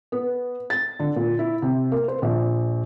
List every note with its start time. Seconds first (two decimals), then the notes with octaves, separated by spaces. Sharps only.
0.12 B3
0.70 A6
1.00 D3
1.16 A#2
1.39 E4
1.62 C3
1.92 A#3
2.08 C5
2.22 A#1